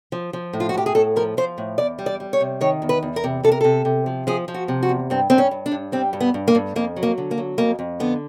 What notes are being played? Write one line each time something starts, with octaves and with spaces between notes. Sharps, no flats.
F3
F3
A2
F4
F#4
A2 G4
G#4
A2 A4
F3 A#4
F3 C5
A2
E2 D5
G3
D5
G3
C#5
C3
D#3 C#5
E2
B4
E2
A#4
C3
C3 A4
A#4
C3 A4
C3
F3
F3 G#4
F3
F#4
C3
F#4
E2
G2 C4
G2 C4
C#4
G2
D4
G2
G3 C4
G2
B3
G2
A#3
G2
F2 A#3
F#3
A#3
D3
A#3
F#3
F2 A#3
F2
D3 B3